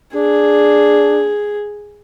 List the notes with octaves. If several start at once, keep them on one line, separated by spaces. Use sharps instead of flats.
D4 G#4